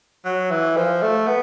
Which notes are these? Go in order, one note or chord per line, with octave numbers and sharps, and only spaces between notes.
F#3
E3
F3
A3
B3